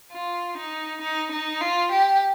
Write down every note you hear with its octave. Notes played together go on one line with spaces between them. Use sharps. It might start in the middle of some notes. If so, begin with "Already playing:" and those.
F4
D#4
D#4
D#4
F4
G4